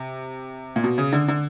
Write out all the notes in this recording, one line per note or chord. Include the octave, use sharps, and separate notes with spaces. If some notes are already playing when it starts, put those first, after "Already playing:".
Already playing: C3
A#2
B2
C#3
D3
D3